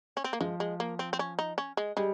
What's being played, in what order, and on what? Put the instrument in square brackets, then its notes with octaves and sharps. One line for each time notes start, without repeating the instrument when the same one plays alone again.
[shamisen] C#4
C4
A#3
[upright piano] F3 [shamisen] G#3
[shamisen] G#3
A#3
C4
C4
C#4
D#4
C#4
G#3
[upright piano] G3 [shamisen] G#3